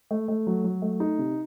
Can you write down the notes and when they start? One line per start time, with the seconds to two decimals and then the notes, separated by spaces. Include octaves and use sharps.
0.11 A3
0.28 A3
0.47 F#3
0.64 F#3
0.82 A3
1.00 D#4
1.18 C3